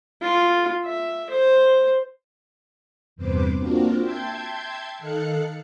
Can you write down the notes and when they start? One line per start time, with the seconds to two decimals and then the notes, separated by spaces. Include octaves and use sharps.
0.22 F4
0.85 E5
1.30 C5
3.16 E2 G2 C3 B4 C5 D6
3.57 A#3 C4 D4 F4 F#4 A#4
3.98 E5 G5 A5 C6 G6 G#6
4.99 D#3 D#4 A4 F5 F#6 C#7